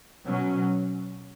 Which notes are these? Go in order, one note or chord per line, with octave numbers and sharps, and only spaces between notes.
B2 F#3 C#4